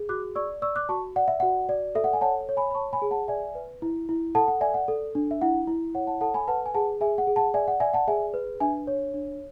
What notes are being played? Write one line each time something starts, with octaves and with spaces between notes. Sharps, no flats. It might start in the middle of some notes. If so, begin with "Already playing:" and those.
Already playing: G#4
F#4 D6 F#6
D5 C#6 E6
D5 C#6 E6
D6 F#6
F#4 A5 C#6
D5 F#5
E5
F#4 F#5
D5
A4 E5
F#5
G#5
C#5 F#5 A5
C#5
G#5 B5
B5
C#5 A5 C#6
G#5 B5
G#4
F#5 A5
D5 E5 G#5
B4
E4
E4
A4 F#5 A5
F#5
D5 E5 G#5
F#5
A4
D4
E5
E4 F#5
E4
C#5 F#5
F#5 A5
A4 F#5 A5
G#5 B5
B4 F#5 A5
G#5
G#4 F#5 A5
G#4 E5 G#5
F#5
G#4
F#5 A5
D5 E5 G#5
F#5
D5 E5 G#5
F#5 A5
G#4 E5 G#5
B4
D4 E5 G#5
C#5
D4